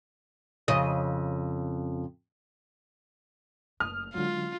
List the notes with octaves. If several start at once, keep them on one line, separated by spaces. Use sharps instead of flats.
F2 C#3 D#5
F#1 A3 D#6 F6
D3 F#3 G#3 D#4 F4